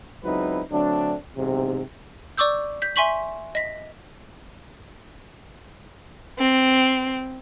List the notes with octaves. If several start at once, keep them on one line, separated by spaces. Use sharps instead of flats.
C#2 F#3 C4 D#4 E4 B4
D3 F#3 A3 C4 D4
B1 E2 G#2 C3
D5 C#6 D6 E6 G6
G6 B6
E5 G#5 C6 C#6 B6 F#7
D#5 B6
C4